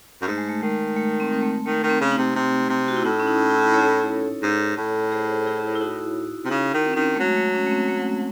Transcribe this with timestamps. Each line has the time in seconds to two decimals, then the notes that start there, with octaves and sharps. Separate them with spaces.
0.21 F#2
0.27 G#2 A3
0.38 G#3
0.49 A3
0.62 D#3 G#3
0.96 A3
1.20 C4
1.33 C4
1.43 A3
1.66 D#3 A3
1.83 D#3
1.90 C4
2.01 C#3
2.12 D#4
2.18 C3
2.35 C3
2.69 C3
2.88 F#4
2.97 E4
3.04 A2 D#4
3.20 C#4
3.27 D#4
3.50 E4
3.74 A4 C#5
4.42 G#2
4.77 A2
5.12 G#4 C5
5.46 E4 G#4
5.75 E4
5.81 D#4 F#4
6.45 C3
6.50 C#3 D#4
6.74 D#3
6.85 C4
6.93 D#3 C#4
7.02 C4
7.15 A3
7.19 F#3 G#3
7.37 A3
7.54 C#4
7.66 A3
7.71 C4
7.88 A3